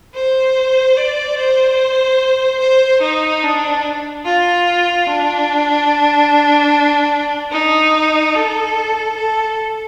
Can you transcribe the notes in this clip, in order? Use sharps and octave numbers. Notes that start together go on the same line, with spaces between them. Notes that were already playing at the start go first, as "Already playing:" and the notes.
C5
D5
C5
C5
D#4
D4
F4
D4
D#4
A4
A4